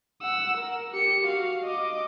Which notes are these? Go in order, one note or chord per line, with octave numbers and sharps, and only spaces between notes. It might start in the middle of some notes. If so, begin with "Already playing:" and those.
F#5 E6
A#4
G4 C#7
F#4 F5
D#5 D6